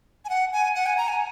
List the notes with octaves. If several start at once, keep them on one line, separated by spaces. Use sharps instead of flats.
G#5
F#5
G#5
F#5
G#5
A#5
G#5